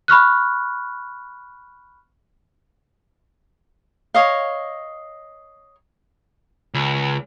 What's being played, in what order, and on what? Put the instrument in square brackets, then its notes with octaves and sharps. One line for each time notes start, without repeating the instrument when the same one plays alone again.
[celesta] B5 C#6 F6 F#6
[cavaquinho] C#5 D#5 F5
[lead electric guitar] C#2